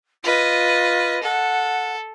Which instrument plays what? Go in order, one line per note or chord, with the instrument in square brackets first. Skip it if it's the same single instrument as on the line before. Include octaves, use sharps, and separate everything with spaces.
[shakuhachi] F4 [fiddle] B4 D#5
[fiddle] A4 [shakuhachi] F#5